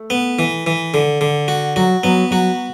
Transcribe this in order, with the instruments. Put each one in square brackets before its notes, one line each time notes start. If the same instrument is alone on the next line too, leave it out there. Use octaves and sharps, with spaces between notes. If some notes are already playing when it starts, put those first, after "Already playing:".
Already playing: [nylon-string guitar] A3
[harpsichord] B3
E3
E3
D3
D3
F#4
[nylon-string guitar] F#3 [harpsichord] F#4
[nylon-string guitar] F#3 [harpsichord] B3
[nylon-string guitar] F#3 [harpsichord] F#4